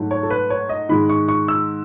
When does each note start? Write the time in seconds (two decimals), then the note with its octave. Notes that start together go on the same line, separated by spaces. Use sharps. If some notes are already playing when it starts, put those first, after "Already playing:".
Already playing: G#2 F#3 A3
0.11 C#5
0.23 A4
0.30 B4
0.50 C#5
0.69 D#5
0.89 G#2 D#3 G#3 B5
1.09 C#6
1.28 C#6
1.48 E6